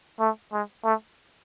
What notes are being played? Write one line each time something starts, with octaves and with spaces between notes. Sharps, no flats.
A3
G#3
A3